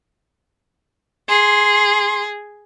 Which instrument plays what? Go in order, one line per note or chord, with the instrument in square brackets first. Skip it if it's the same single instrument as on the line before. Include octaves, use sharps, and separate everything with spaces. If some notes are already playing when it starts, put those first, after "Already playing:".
[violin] G#4 [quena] C6